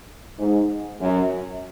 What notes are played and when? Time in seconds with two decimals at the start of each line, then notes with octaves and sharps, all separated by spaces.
0.39 G#2
1.00 F#2